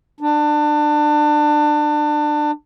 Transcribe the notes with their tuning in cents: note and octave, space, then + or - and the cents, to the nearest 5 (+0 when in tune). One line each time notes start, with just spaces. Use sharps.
D4 +25